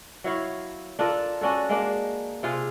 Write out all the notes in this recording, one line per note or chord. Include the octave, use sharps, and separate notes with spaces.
F#3 E4 C#5 F5
D4 F4 A4 A#4
C#4 D4 F#4 A4
G#3 A#3 D4
C3 F4 G#4